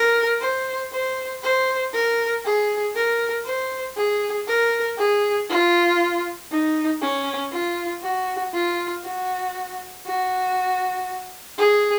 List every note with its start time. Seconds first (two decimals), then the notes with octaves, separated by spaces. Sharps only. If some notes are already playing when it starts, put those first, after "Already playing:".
Already playing: A#4
0.41 C5
0.92 C5
1.43 C5
1.93 A#4
2.45 G#4
2.96 A#4
3.45 C5
3.97 G#4
4.47 A#4
4.98 G#4
5.49 F4
6.51 D#4
7.01 C#4
7.52 F4
8.03 F#4
8.54 F4
9.04 F#4
10.06 F#4
11.58 G#4